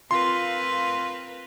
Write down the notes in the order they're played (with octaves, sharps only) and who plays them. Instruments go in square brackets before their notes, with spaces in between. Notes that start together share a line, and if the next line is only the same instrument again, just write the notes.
[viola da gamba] C4 A#4 B4 [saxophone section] F4 [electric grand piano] C6